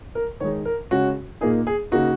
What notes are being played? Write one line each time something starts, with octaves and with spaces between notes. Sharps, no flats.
A#4
D#3 G#3 D#4 C#5
A#4
C#3 G#3 C#4 F#4
A#2 A#3 D#4 G#4
G#4
C#3 A#3 D#4 F#4